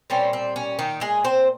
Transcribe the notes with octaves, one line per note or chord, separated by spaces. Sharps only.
A#2 G3 C4 C#4
C4
C#4
D#3 D#4
G#3 G#4
C4 C5